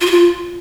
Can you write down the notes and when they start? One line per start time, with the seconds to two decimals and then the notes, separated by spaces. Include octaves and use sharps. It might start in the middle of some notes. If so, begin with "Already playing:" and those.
0.01 F4
0.06 F#4
0.11 F4